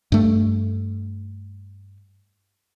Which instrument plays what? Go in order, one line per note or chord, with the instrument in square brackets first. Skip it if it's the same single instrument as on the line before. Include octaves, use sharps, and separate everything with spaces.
[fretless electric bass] G2 A3